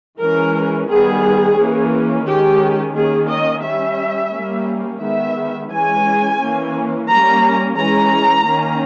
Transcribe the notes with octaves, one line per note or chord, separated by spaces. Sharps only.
E3 G#3 C#4 A#4
D#3 G3 B3 G#4
E3 A#3 C#4
D#3 G#3 C#4 G4
D#3 A#3 C#4 G#4
D#5
G3 C#4 E5
G3 A#3 C#4
D#3 G#3 B3 E5
E3 G#3 C#4 G#5
E3 A#3 C#4
G3 A#3 C#4 A#5
E3 G#3 C#4 A#5
D#3 A#3 C#4